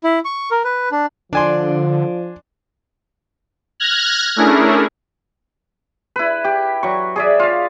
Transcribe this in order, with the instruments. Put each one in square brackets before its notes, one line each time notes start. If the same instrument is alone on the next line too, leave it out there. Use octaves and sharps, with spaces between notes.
[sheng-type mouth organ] E4
C#6
A#4
B4
D4
[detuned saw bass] D3 [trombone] F3 [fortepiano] D4 G#5 C6 [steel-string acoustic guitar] D5
[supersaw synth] F6 F#6 G#6 A#6
A3 C#4 D4 E4 G#4 A#4
[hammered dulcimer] E4 B4
G4
F#3 C#6
G#4 D5 E5
F4 F5